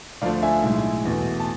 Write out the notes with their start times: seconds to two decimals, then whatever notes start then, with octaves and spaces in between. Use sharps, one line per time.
0.22 D2 D3 F3 A3 D5 F5
0.43 E5 G#5
0.63 B1 A2 G#3
1.05 E2 B2 A3
1.40 A5